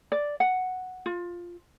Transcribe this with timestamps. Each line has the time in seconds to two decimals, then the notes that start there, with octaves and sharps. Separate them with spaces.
0.12 D5
0.40 F#5
1.06 F4